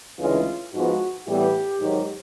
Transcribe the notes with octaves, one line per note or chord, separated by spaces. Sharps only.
D2 C#3 E3 G#3 C#4 F4
G#2 F3 G#3 B3 F#4
A2 E3 G3 B3 G4
G#2 D#3 F#3